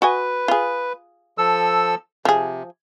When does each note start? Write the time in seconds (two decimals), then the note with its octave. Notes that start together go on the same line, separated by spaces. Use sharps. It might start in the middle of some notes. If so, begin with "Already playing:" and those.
0.02 F#4 B4 D#5 G#5
0.48 F4 G#4
1.38 F3 A4 E6
2.25 C3 F3 G#4